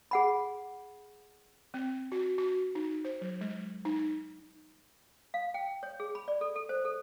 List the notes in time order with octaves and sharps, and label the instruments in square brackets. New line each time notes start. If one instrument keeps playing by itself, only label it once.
[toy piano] G#4 F#5 B5
[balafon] C4
F#4
F#4
D#4
C5
F#3
G#3
D#4
[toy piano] F5
G5
C#5
G#4
B5
D5
A4
A4
C5
A4